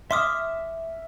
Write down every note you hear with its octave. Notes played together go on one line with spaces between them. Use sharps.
E5 C6 D6 D#6 F6